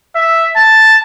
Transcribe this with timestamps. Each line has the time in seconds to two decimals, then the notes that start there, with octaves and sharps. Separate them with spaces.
0.15 E5
0.56 A5